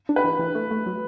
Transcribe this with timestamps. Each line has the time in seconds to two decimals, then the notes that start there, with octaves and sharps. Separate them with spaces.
0.09 D4
0.16 B4
0.24 E3
0.39 E3
0.55 A3
0.71 A3
0.86 F#3